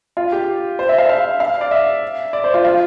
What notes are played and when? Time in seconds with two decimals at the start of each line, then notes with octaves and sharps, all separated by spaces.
0.17 F4
0.32 G4
0.79 C5
0.89 E5
0.98 F5
1.09 F5
1.40 F5
1.61 D5
1.71 E5
2.33 D5
2.44 C5
2.54 F4
2.65 F4